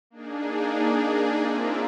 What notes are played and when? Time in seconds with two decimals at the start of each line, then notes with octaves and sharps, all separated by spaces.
0.10 A#3 D4 D#4 G#4
1.40 A#3 C4 F4 A#4 E5